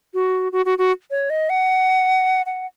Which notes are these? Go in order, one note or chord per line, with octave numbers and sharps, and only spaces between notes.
F#4
F#4
F#4
F#4
C#5
D#5
F#5
F#5